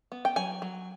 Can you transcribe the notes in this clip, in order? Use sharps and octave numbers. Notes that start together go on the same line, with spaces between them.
B3
G5
F#3 G#5
F#3